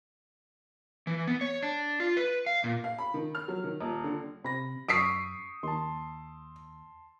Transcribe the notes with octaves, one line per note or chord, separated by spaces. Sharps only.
E3
B3
C#5
D4
F4
B4
F5
A#2
F5
B5
D#3
F6
F#3
D#3
D#1
D3
C3 B5 A#6
F#2 C#6 D#6 E6 B6 C7 D7
D#2 A5 C6